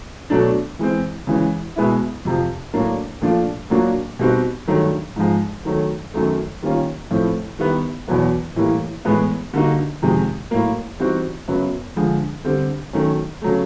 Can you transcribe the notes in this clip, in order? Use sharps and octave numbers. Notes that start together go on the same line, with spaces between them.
B2 F#3 A3 D4
E3 G#3 C4
C#3 E3 G#3
B2 G#3 B3 E4
F2 C3 F3
A2 F#3 A#3 D4
A#2 F3 A3 D4 F4
A#2 F#3 A#3 D4 F#4
B2 G3 C4 D#4 F#4
G2 D#3 F#3 A3
G#2 F3 G#3
D#3 F#3 A3
F#2 D#3 F#3 A3
D#3 G3 A#3 C#4 F4
A2 F3 A3 C4 E4
D#3 G3 B3 E4
E2 B2 F#3 B3
A2 E3 G3 A#3
A2 E3 G#3 B3
D3 G3 A#3 D#4 F#4
F2 C3 D#3 G#3
A2 F#3 A#3
E3 G3 C4 D#4 F#4
F#2 C#3 F#3 B3
D3 F3 G#3
D3 G3 C4
D#3 F#3 A3 C#4
C#3 F#3 A3